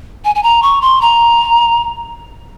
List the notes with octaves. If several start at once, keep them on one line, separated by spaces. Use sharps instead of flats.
G#5
G#5
A#5
C#6
C6
A#5